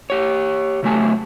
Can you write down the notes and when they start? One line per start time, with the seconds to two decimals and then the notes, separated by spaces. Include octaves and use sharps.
0.10 G4 C#5
0.83 C#3 F#3 A3 G#5 A5